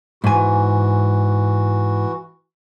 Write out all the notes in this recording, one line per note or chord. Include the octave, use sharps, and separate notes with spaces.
G#2 E3 F#4 G#5